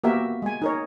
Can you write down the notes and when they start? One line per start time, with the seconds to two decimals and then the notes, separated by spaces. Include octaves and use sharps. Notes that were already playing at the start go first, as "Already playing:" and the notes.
0.04 A#3 B3 F#4 G4 A#4 E5
0.42 G#3 G#5
0.62 D#4 A#4 C#5